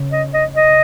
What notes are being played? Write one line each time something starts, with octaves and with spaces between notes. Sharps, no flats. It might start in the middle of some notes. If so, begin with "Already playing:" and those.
Already playing: C#3
D#5
D#5
D#5